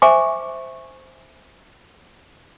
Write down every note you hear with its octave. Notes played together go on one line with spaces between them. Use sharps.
C5 E5 G#5 C#6 D6